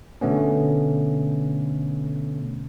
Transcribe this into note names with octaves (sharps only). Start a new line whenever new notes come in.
B2 D3 A3 B3 C#4